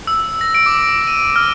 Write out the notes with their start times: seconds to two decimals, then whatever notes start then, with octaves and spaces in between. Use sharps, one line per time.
0.07 E6
0.41 A#6
0.55 D7
0.66 D6
1.07 D#7
1.36 F6